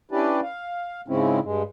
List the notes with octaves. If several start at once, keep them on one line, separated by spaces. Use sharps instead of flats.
C#4 D4 E4 G4 B4 D5
F5
G#2 C#3 G#3 C4 C#4 E4
G2 G#3